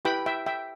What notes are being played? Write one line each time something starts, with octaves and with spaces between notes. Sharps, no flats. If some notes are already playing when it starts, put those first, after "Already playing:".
E4 G4 B4 G5 B5
E5 G5
E5 G5